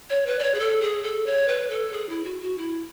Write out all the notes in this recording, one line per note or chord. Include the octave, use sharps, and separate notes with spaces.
C#5
B4
D5
C#5
G#4
A4
G#4
A4
C#5
B4
A4
G#4
E4
F#4
F#4
E4